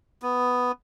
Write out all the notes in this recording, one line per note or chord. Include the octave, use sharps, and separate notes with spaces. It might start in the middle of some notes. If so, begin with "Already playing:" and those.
B3